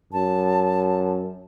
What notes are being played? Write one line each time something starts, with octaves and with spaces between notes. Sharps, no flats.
F#2 A5